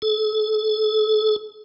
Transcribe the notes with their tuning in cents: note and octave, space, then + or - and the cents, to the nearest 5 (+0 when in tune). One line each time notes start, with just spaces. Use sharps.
A4 -35